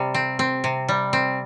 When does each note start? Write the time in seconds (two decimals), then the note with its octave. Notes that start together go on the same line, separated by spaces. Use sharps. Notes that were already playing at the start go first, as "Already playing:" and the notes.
Already playing: C3 G3
0.14 C4
0.39 C4
0.64 C3
0.89 G3
1.13 C4